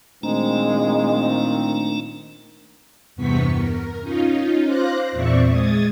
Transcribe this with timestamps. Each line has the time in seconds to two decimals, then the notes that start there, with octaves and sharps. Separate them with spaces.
0.23 A#2 D#3 G#3 A3 C4 D4 A#5
3.16 E2 G2 C3 B3 C#6 B6
3.53 A#4
4.01 C#4 D#4 F4
4.65 C5 F5 C6 D6 F#6 A#6
5.12 E2 A#2 C4 D5 E5 C#6
5.49 G#3 D#6 G#6 A6